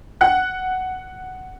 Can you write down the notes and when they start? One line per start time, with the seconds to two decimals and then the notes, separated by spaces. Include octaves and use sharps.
0.21 F#5 F#6